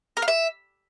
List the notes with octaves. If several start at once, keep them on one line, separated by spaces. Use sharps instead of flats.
A#4
F5
E5